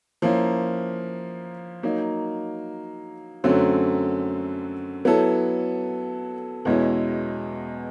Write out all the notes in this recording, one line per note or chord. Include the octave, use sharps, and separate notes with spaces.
F3 A#3 C#4 E4
F#3 A#3 D#4
F#2 D3 F#3 A3 C4
F#3 B3 E4 A4
E2 B2 G#3 C#4 E4